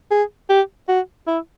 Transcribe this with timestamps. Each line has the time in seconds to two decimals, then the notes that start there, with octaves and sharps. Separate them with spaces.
0.11 G#4
0.49 G4
0.88 F#4
1.27 E4